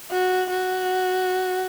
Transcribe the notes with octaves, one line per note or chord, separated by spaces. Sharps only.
F#4
F#4